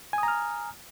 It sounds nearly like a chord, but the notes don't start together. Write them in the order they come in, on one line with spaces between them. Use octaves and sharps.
G#5 D#6 A#5 F6